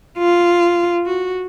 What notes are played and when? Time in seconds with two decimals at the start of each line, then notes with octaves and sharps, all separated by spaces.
0.19 F4
1.06 F#4